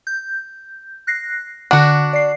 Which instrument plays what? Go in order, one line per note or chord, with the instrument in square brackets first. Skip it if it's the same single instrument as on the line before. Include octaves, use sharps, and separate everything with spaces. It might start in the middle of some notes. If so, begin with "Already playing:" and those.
[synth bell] G6
F#6 A#6 C7
[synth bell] D3 F#5 [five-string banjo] D4 F#4
[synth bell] D5 C7